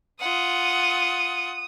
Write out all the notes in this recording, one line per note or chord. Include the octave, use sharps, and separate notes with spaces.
F4 F#5 D#6